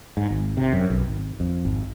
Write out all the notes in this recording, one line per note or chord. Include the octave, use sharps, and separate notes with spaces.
G#2
G#1
C3
F#2
B1
G#1
F2
G#1